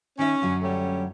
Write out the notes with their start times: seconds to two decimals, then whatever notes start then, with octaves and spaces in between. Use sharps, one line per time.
0.19 D#3 C#4 E5
0.42 F#2 D3 F#3
0.62 G3 A3 C#4